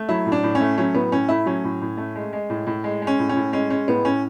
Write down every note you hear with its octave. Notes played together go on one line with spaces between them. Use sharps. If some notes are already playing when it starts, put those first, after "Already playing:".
Already playing: A3
F#3 E4
A2
D4
A2
C#4
A3
F#3 C#4
A2 B3
A2 C#4
A3 E4
F#3 C#4
A2
A2
A3
G#3
G#3
A2
A2
G#3
G#3
C#4
A2
C#4
A2
G#3 C#4
G#3 C#4
A2 B3
A2 C#4